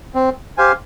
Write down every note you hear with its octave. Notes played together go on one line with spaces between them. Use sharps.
C4
G4 C5 F5 G#5